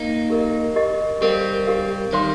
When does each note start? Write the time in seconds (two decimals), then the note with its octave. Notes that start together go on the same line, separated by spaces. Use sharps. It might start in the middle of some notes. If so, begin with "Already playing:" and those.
Already playing: A#3 D#4
0.30 G4 A#4 D#5
0.76 G4 A#4 D#5
1.21 G3 C4 G4 A#4 F5
1.67 G4 A#4 F5
2.13 D#3 G3 C5 F5 C6